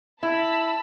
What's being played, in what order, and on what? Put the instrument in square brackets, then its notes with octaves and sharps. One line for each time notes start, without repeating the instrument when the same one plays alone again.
[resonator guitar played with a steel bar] E4 [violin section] A5 B5 E6